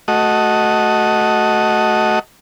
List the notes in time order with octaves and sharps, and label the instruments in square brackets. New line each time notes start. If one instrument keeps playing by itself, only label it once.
[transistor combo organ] A3 F#4 D#5